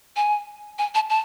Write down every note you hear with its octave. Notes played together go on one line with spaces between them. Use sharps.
G#5
G#5
A5
A5